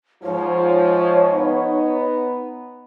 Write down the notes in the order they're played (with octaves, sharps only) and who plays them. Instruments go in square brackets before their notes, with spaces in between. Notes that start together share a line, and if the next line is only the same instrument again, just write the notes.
[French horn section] G#2 F3 [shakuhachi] C#5
[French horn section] B3 D#4